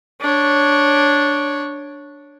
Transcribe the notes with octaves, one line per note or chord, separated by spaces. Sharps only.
D4 C#5